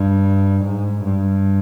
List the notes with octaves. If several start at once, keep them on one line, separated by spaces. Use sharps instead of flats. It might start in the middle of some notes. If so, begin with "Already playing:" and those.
Already playing: G2
G#2
G2